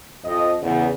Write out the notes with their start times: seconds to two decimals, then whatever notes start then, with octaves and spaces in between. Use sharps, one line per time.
0.25 F2 F3 D#5
0.62 E2 C#3